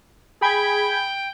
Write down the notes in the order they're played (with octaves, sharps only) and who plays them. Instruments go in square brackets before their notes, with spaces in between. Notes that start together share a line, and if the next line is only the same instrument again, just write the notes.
[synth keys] G#4 B5 G#6 [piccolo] G5